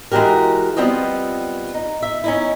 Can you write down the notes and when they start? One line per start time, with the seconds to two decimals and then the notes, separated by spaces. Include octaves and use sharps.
0.12 E3 G#3 F#4 G4 A#4
0.77 G3 B3 C4 F4 D#5
1.74 D#4
2.02 E5
2.24 C#4 D#4 E4